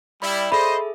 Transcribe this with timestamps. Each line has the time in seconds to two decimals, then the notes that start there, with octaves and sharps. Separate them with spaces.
0.22 G3 E4 D5 B5
0.52 G#4 A4 C5 D#5 E5 B5